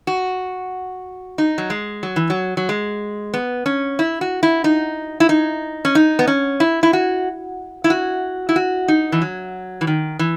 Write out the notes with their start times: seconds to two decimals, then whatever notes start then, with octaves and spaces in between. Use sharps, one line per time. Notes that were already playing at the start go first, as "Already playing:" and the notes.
0.07 F#4
1.38 D#4
1.58 F#3
1.70 G#3
2.03 F#3
2.16 E3
2.30 F#3
2.57 F#3
2.69 G#3
3.34 B3
3.66 C#4
3.99 E4
4.21 F#4
4.43 E4
4.64 D#4
5.20 E4
5.29 D#4
5.85 C#4
5.95 D#4
6.19 B3
6.27 C#4
6.60 E4
6.83 E4
6.93 F#4
7.84 E4
7.90 F#4
8.49 E4
8.56 F#4
8.88 D#4
9.12 E3
9.22 F#3
9.81 E3
9.87 D#3
10.19 E3